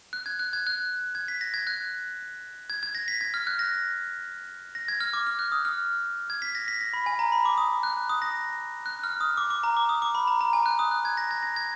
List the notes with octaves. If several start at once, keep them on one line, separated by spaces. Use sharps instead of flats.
F#6
G#6
F#6
G#6
F#6
G#6
B6
A#6
G#6
F#6
G#6
G#6
A#6
B6
G#6
F6
F#6
A#6
A#6
G#6
F6
D6
F6
F#6
D#6
F6
G#6
B6
A#6
B6
A#6
B5
G#5
A#5
B5
D6
D#6
F#6
D#6
A#6
F#6
F6
D#6
D6
D6
A#5
D6
D#6
D6
B5
A#5
A#5
G#5
F#6
D#6
F#6
G#6
A#6
G#6
A#6
G#6